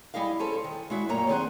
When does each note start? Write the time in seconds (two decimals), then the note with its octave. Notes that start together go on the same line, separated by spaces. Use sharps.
0.14 G3 E4 G#4 D#5 F5
0.39 C#4 G#4 A4 C5
0.64 D#3
0.90 G#3 E4 F#4 E5
1.09 F#2 A#2 G3 A#3 C#5 A#5
1.29 D#3 C4 G#4 C5 F#5